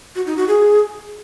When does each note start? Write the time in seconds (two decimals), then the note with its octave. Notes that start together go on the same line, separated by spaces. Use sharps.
0.16 F#4
0.26 D#4
0.37 F#4
0.48 G#4